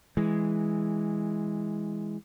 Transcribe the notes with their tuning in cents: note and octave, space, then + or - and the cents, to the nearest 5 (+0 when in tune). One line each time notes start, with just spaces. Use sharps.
E3 +0 G#3 +0